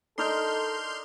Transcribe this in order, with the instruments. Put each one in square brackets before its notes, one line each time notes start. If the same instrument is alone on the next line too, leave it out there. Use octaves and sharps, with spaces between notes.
[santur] D4 D#4 A#4 [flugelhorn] A4 [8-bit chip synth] C6 F6 G6